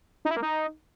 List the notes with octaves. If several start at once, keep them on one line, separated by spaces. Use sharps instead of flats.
D#4
E4
A#3
D#4